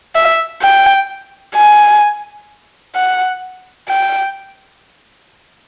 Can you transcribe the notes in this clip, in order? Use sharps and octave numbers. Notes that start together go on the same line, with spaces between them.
E5
G5
G#5
F#5
G5